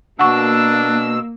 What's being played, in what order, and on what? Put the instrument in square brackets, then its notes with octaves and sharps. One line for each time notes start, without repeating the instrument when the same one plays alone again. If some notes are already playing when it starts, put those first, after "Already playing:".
[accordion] B2 E6 [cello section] A#3 [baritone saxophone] D4 [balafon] F#5 C#6